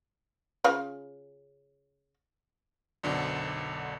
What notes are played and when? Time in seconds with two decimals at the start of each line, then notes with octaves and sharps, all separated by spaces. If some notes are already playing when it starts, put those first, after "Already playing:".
0.64 C#3 F4 F5
3.03 B1 F#2 D3 F#4 A4 C5